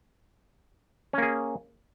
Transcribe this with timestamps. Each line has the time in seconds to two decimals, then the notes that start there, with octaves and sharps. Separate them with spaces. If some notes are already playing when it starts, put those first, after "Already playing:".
1.13 C#4
1.18 A#3
1.22 G#4